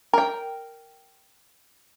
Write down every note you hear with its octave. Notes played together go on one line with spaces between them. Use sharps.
A#4 G5